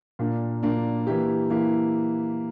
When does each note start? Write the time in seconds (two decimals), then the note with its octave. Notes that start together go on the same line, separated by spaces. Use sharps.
0.19 A#2 A#3 D4
0.63 A#2 A#3 D4
1.07 E3 A#3 E4 G4
1.50 E3 A#3 E4 G4